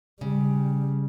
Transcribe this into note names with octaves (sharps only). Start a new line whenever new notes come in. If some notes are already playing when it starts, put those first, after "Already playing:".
C#3 G3